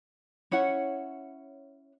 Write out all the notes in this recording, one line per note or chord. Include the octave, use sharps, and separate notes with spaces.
C#4 E4 C#5 F#5